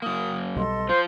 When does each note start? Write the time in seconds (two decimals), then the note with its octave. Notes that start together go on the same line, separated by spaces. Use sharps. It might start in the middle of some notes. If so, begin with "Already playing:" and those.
0.02 F#2 A#3 D#6
0.56 B1 B2 G3 A4 D#5 C6
0.89 F3 F4 C5